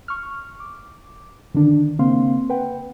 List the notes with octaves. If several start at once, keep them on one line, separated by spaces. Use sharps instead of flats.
C#6 F6
D6
D3 D#3 D4
C#3 A#3 C4 F5 C6
B4 F#5 G5